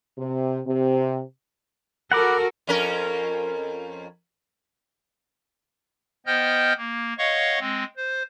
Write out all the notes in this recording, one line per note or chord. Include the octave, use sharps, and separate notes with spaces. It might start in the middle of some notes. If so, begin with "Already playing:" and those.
C3
C3
F#4 A4 A#4 F#5 B5 D6
F2 C#4 A#4
B3 C5 D#5 G5 F6 G6
A#3
C#5 D#5 F5 F#5 C#6
G#3 C4
C5